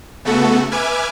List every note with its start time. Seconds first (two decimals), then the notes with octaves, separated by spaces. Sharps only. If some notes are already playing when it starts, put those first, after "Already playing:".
0.25 C#3 A3 B3 F#4 A4
0.71 B4 E5 G#5 D6 F6 G#6